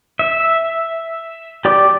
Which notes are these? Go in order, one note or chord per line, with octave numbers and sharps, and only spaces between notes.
E5
G4 D5 D6